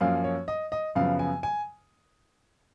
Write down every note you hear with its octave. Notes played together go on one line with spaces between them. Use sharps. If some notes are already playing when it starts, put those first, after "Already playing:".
F#2 F3 A#3 C#4 F5
C#5
D#5
D#5
F#2 C#3 F3 B3 F5
G#5
G#5